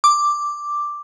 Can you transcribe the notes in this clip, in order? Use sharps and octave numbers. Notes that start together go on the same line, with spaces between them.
D6